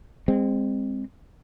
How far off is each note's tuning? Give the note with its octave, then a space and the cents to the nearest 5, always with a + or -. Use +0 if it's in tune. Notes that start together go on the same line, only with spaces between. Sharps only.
G#3 -30 C4 +0